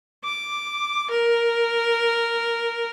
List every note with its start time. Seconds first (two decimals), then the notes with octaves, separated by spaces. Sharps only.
0.25 D6
1.11 A#4